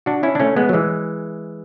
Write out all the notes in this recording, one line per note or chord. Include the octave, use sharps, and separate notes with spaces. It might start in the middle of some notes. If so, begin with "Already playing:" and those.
D4 F#4
C#4 E4
D4
A3 C#4
G#3 B3
F#3
E3 G#3